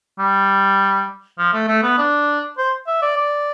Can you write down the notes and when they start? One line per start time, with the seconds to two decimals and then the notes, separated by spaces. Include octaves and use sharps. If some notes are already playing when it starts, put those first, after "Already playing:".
0.19 G3
1.39 F3
1.53 A3
1.68 A3
1.83 B3
1.98 D4
2.58 C5
2.87 E5
3.02 D5
3.17 D5